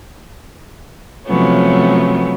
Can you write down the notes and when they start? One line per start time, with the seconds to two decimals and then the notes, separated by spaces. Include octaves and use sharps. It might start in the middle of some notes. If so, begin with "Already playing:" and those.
1.26 C3 F3 F#3 A3 B3 C#4